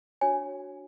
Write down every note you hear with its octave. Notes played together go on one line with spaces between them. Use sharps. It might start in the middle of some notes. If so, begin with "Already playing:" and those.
D4 F#4 C#5 G#5